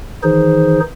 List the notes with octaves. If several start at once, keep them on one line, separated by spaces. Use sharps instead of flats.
D#3 E3 D#4 G#4 C5